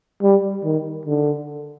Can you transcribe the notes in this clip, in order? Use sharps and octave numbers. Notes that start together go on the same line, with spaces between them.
G3
D#3
D3